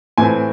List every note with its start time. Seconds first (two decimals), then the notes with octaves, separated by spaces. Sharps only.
0.18 A2 E3 A3 C4 G#5